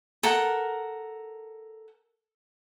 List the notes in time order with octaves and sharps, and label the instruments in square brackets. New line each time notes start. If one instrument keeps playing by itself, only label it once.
[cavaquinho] A4 A#4 F#5